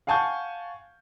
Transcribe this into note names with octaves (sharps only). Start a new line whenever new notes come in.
F5 F#5 G#5 A5 C#6 G6